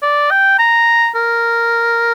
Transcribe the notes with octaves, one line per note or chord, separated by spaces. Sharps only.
D5
G5
A#5
A#4